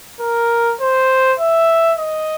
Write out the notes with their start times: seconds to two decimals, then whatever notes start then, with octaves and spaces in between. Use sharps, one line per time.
0.20 A#4
0.81 C5
1.39 E5
1.98 D#5